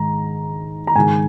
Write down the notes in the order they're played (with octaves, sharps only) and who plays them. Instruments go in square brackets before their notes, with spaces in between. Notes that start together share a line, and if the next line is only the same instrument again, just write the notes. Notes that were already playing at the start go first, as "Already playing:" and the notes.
Already playing: [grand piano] G#2 D#3 A#5
A#5
G#2 D#3 G#5